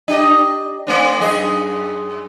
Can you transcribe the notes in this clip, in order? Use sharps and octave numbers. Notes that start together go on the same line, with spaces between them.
D4 G4 D#5
A3 C4 D4
F#2 G#4 D#5